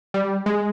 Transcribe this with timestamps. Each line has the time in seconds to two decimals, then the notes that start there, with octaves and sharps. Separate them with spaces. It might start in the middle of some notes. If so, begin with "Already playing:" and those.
0.14 G3
0.46 G#3